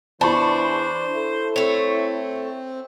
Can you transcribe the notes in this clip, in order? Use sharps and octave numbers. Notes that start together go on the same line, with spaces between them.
E2 E3 D4 C5 A5 B5 C#6
E4 A4
A3 C4 C#5